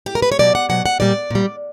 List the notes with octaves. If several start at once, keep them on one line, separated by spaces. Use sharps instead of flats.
G4
A#4
B4
C#5
B2 F#3 D5
F#5
B2 F#3 F#5
F#5
A#2 G3 D5
A#2 G3